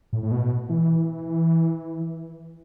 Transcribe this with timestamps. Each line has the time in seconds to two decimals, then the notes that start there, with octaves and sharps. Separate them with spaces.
0.13 A2
0.23 A2
0.32 B2
0.69 E3